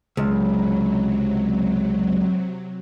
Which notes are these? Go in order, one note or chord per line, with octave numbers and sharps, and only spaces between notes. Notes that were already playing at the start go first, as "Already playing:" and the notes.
C#2 C3 F#3